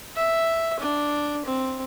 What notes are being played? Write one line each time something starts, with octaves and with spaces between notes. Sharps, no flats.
E5
D4
C4